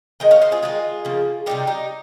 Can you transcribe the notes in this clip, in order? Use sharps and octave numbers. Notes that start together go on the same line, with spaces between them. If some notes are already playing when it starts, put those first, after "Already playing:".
D#3 G#3 D#5 G5
C#5 F5
C5 D#5
F4 G#4
D#3 G#3 F4 G#4
C#3 F3 A#3
C3 G3 A#3 D#4 G4
D#4 G4